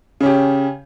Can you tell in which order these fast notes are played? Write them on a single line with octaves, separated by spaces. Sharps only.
C#3 C#4 G4